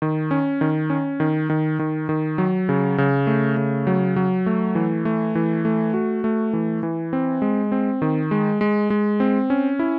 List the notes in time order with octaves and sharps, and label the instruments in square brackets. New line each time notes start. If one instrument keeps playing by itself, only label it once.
[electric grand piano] D#3
C#4
D#3
C#4
D#3
D#3
D#3
D#3
F#3
C#3
C#3
A3
C#3
F#3
F#3
A3
E3
A3
E3
A3
F#4
A3
E3
E3
C4
G#3
C4
D#3
G#3
G#3
G#3
C4
C#4
E4